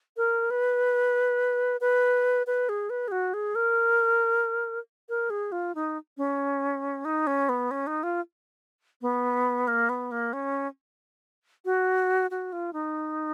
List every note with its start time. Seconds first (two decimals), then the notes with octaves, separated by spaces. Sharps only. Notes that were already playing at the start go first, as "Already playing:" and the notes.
0.17 A#4
0.50 B4
1.81 B4
2.47 B4
2.69 G#4
2.90 B4
3.08 G#4
3.12 F#4
3.34 G#4
3.55 A#4
5.09 A#4
5.30 G#4
5.52 F4
5.75 D#4
6.18 C#4
7.05 D#4
7.27 C#4
7.49 B3
7.71 C#4
7.87 D#4
8.03 F4
9.02 B3
9.68 A#3
9.89 B3
10.11 A#3
10.33 C#4
11.65 F#4
12.31 F#4
12.52 F4
12.73 D#4